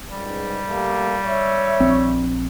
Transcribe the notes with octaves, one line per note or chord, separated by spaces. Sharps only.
C#2 G#2 G3
A3 A#3 G4
C#5 E5
A#1 C4